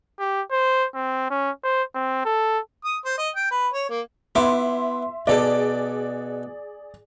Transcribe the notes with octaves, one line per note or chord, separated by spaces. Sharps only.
G4
C5
C4
C#4
C5
C4
A4
D#6
C5
D#5
G5
B4
C#5
A#3
B3 E4 E5 C6 D6
B2 G#4 A4 D5 A5